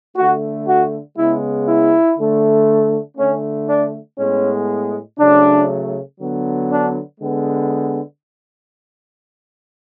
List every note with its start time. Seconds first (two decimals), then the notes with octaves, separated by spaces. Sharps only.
0.17 D3 A3 F#4
0.66 F#4
1.17 C#3 G#3 B3 E4
1.67 E4
2.17 D3 A3
3.17 D3 A3 C#4
3.68 D4
4.18 A2 G#3 B3 C#4
5.18 C#3 F#3 A3 D4
6.19 D3 F#3 B3
6.69 D4
7.20 D3 G#3 B3